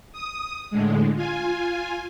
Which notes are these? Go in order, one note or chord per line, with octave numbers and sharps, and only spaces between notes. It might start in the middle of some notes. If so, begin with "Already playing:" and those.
D#6
A2 D3 G#3
F4 G#5